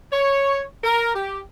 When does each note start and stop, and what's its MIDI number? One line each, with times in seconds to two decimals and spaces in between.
0.13 0.64 73
0.84 1.12 70
1.15 1.40 67